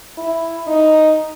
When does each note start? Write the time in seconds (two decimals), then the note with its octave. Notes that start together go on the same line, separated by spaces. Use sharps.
0.18 E4
0.67 D#4